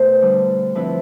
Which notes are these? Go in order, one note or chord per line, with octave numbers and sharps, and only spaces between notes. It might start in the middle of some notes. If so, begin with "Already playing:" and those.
Already playing: B2 A3 C5
D3 G3 D4
D3 F3 C4 E4 B4